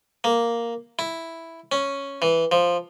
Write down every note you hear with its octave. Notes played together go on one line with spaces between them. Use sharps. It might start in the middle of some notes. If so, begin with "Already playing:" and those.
A#3
E4
C#4
E3
F3